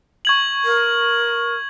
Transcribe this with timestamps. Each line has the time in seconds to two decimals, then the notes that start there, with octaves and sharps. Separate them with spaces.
0.25 C#6 G#6 F#7
0.64 A#4